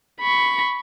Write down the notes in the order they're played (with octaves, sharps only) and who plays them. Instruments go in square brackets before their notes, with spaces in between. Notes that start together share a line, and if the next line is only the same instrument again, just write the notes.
[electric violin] B5 C#6